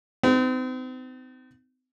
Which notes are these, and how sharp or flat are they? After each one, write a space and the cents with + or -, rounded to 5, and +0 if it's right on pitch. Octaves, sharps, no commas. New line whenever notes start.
C4 -40 D#4 +0